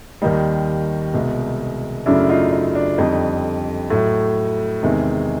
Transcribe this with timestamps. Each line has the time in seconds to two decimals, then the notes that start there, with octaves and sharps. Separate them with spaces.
0.22 D#2 D#3 G3 D#4
1.14 C2 B2 G#3
2.06 F#2 C#3 F#3 A3 D4 E4
2.29 D#4 F4
2.53 D#4
2.75 D4
2.98 F2 D3 G3 D#4
3.90 A2 F#3 A3
4.83 E2 C3 D#3 G#3